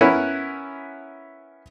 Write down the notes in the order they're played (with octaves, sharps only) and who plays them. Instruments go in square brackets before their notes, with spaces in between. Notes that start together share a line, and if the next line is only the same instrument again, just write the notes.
[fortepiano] B3 C#4 E4 A#4 F#5